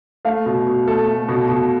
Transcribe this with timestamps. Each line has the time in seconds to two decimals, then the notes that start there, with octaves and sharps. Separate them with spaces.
0.25 A3 F5
0.46 B2
0.67 B2
0.87 A3 A4
1.08 A3
1.28 B2
1.48 B2